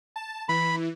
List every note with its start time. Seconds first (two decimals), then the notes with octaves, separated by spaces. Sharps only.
0.16 A5
0.49 E3 B5